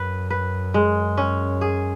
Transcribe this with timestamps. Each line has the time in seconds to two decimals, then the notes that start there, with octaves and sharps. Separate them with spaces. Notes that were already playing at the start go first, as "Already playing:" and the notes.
Already playing: F#2 B4
0.30 B4
0.74 G#3
1.18 C#4
1.61 G#4